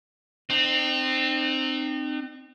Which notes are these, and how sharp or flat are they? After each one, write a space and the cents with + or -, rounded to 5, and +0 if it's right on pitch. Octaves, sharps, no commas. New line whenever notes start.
C4 +0 D#4 -40